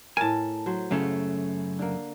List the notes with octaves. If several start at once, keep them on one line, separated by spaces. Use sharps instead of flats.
A2 A#4 G#5 A5
F#3 C5
F#2 C#3 A3
D3 A#3